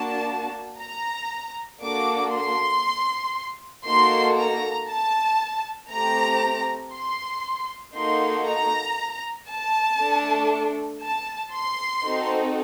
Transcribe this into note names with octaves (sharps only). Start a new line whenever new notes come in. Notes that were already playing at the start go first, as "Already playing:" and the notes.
Already playing: A#3 D4 F#4 A5
A#5
A#3 D4 F#4 A4 D6
C6
A#3 D#4 F#4 A4 C6
A#5
A5
A3 C4 G4 A#5
C6
A#3 D#4 F#4 A4 C6
A#5
A5
A3 D4 A4
A5
C6
C4 D#4 F#4 A4